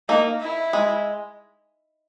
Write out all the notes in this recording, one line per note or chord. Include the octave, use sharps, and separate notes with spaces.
A#3 D#4
E4
G#3